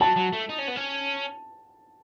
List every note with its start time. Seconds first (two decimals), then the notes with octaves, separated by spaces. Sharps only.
0.01 F#3 A5
0.17 F#3
0.33 A3
0.49 D#4
0.58 C#4
0.68 B3
0.76 C#4